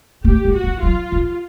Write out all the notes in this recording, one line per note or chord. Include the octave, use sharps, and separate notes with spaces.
A3 G4
G3
F#4
F3
F#3 F4
F3